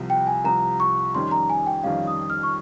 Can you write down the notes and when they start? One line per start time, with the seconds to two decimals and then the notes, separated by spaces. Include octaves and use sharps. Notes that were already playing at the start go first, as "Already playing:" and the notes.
Already playing: C2 C3 F3
0.10 G5
0.27 G#5
0.44 C2 C3 F3 A#5
0.80 C#6
1.14 F2 D#3 G3 C#4 C6
1.31 A#5
1.50 G#5
1.66 G5
1.83 F2 D#3 G3 C#4 F5
2.07 D#6
2.30 F6
2.43 C#6